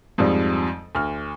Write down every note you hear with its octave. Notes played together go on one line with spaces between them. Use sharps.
F2 G#2 F3 G3
D2 F6